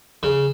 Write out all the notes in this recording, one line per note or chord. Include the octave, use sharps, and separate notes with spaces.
C#3